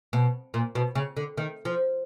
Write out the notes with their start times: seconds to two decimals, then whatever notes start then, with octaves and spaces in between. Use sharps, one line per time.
0.13 B2
0.54 A#2
0.75 B2
0.95 C#3
1.17 D3
1.38 D#3
1.65 F3